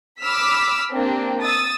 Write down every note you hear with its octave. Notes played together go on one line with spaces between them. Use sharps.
B5 D6 E6 F6 B6
A#3 C4 D4 G4
D#6 E6 A6